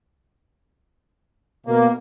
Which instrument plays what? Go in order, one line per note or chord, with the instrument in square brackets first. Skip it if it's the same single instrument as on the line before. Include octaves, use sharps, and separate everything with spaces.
[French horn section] B2 [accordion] A#3